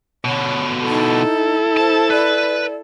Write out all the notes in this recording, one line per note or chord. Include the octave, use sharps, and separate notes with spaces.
B2 D3 C#5
D#4 E4 A4
C5 A5
B4 D5